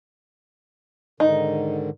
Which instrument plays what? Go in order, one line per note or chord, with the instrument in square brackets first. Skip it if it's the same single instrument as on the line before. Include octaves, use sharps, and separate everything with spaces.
[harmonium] G#2 D3 D#3 [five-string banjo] D#4